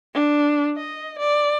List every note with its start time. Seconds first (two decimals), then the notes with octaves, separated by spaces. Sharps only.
0.14 D4
0.76 D#5
1.19 D5